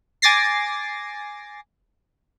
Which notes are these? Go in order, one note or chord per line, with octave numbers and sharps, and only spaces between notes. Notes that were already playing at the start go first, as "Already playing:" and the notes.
G#5 D6 A6 A#6 C7